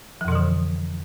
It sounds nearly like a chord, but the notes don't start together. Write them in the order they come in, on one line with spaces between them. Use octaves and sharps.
F3 F2 B2 E3 D3